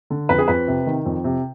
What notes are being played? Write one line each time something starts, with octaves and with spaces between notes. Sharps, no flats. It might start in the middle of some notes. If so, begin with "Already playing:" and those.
D3
F2 B4
G#4
F2 B4
C3
D#3
F2
C3